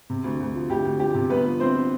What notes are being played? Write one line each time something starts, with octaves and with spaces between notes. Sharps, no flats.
C3
D2
D2
F3
D2 G4
D2
F3 G4
C3
G1 B3 B4
F3
G1 C4 C5